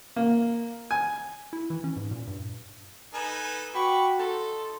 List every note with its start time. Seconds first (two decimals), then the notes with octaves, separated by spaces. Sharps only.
0.16 A#3
0.91 G#5
1.53 E4
1.70 E3
1.84 C#4
1.96 G#2
2.11 A#2
2.27 G2
3.13 D#4 A4 B4 G#5
3.74 F#4 G5 B5 C#6 D6
4.19 D#4 A4 C6